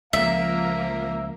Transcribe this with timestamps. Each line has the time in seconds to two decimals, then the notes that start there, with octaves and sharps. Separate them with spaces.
0.13 C#2 F3 A#3 A#4 E5 F5